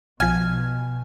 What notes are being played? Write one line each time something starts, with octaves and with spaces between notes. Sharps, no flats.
B1 B2 F3 G#5 F6